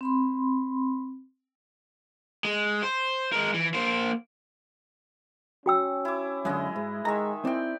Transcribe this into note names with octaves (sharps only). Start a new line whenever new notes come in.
C4 B5 C6
G#3
C5
G#3 A#4
E3
A#3 C5
C#4 F#4 G5 E6
E4 D6
F#2 D3 G#3 E4 D#5
G#2
D#3 G#3 E5 A#5
C4 E4 D5 G5